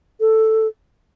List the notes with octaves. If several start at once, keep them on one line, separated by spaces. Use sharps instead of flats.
A4